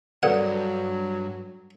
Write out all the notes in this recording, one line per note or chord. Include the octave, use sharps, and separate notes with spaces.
E2 G2 F#3 A4 B4 D5 F#5